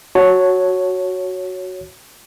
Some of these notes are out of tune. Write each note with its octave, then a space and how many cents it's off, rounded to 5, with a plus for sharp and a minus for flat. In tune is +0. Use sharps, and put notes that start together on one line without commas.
F#4 +0 C#5 +0 A5 +0